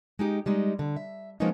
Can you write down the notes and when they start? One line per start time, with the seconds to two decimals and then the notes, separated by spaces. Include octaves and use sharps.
0.19 G#3 D#4 G4
0.46 G3 G#3 D#4
0.79 D3
0.96 E5
1.40 F3 G#3 A#3 B3 C#4 D#4